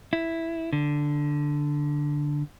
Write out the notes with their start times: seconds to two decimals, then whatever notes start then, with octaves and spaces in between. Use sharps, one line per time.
0.13 E4
0.73 D3